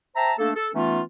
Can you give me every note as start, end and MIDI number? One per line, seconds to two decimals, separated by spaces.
0.16 0.33 72
0.16 0.33 76
0.16 0.33 79
0.16 0.33 81
0.16 0.33 82
0.39 0.51 57
0.39 0.51 58
0.39 0.51 62
0.39 0.51 69
0.55 0.69 69
0.74 1.01 52
0.74 1.01 57
0.74 1.01 59
0.74 1.01 61
0.74 1.01 63
0.74 1.01 65